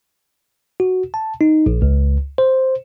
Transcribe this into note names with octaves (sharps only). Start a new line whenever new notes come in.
F#4
A5
D#4
A#1
C#2
C5